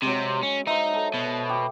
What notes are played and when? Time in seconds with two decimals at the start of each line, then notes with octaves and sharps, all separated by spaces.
0.03 C3 F#3 G#3
0.43 C#4
0.67 D#4 C5 E5
0.94 A4
1.14 B2
1.49 G4